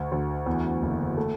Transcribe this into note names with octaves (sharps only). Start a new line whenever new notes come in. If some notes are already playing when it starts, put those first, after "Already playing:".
Already playing: D2
D2
E2
F#1
A3